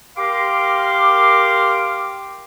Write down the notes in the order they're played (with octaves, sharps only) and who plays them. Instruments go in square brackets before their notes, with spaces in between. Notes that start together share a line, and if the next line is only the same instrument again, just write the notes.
[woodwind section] G4 A#4 F5 C6 D6